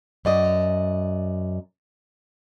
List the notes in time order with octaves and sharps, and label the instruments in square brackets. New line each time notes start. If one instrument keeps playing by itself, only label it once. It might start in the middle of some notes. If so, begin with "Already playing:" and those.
[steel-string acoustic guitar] F#2 D5 D#5